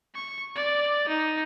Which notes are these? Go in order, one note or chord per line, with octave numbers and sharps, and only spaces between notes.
C#6
D5
D#4